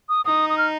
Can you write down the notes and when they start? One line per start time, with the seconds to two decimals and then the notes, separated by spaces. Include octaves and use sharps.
0.09 D#6
0.25 D#4 D#6
0.50 D#6
0.58 F6